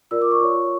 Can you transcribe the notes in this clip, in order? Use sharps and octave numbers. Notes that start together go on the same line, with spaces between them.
F4 A#4 D5 E6
D6
C#6
F4 C#5